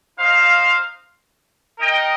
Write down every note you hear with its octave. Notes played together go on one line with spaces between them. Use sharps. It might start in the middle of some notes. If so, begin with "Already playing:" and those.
D#4 C5 F5
D#4 A#4 D#5 G5